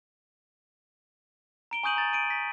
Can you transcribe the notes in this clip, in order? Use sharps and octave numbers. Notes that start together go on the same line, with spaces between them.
A#5 D7 G7
G#5 C#6 D#6 G6 D#7 F#7
A#5 A6
D7 D#7
B6